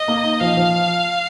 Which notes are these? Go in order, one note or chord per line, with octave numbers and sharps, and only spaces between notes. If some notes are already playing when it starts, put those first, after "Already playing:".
Already playing: D#5
A#3
D#4
F3 F5
F3